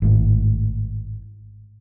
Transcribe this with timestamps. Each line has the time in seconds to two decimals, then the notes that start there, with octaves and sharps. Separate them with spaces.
0.02 G#1 A2